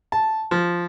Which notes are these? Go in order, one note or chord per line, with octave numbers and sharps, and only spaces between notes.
A5
F3